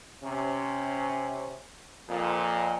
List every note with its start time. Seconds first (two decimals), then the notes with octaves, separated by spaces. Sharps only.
0.23 C3 C#4
2.09 F2 A#2